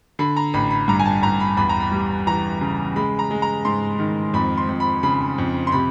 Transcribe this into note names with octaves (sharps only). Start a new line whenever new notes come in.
D3 B5
A#5
A1 B5
B5
G2 A#5
G#5
A5
A1 A#5
B5
E2 B5
A#5
B5
G3
E3 A#5
C#3
G#3 B5
A#5
G#3
A#5
G#2 C6
D#3
F2 B5
C6
F2
B5
C#3 B5
F2
C6
C3 B5